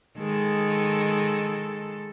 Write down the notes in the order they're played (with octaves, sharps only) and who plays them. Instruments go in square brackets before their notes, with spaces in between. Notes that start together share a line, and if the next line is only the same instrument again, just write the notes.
[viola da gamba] D#3 G#3 A4